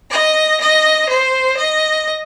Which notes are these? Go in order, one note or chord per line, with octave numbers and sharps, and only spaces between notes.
D#5
D#5
C5
D#5